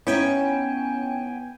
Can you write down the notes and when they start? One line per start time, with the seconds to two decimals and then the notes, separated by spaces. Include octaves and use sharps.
0.07 B3 C#4 D#4 E4 C#5 G5 G#5